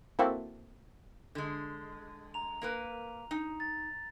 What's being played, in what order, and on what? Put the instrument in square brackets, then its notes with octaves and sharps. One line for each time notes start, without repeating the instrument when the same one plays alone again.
[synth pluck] A#3 C4 E4 F#4 A4
[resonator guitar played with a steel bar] D3 G#3
[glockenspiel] A#5 F7
[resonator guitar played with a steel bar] A#3 A#4 B4
D#4
[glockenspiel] A6